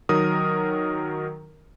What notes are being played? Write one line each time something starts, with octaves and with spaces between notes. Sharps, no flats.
D#3 F#3 A#4 D#6